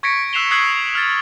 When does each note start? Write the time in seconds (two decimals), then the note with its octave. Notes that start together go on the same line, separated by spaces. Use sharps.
0.03 C#6 G#6 A#6 B6 C#7 D7
0.33 E6 F#6 C7 E7 F7 G7
0.51 D#6 E6 F#6 G#6 C7 F#7
0.95 F6 A6